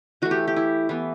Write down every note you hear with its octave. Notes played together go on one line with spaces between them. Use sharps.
E3 A3 F#4
G4
G4
E4
E3 B3